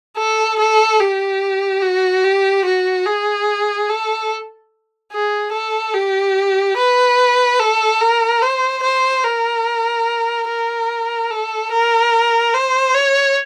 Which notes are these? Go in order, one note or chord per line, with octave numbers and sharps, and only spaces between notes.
A4
A4
G4
F#4
G4
F#4
G#4
A4
G#4
A4
G4
B4
A4
A#4
C5
C5
A#4
A#4
A4
A#4
C5
C#5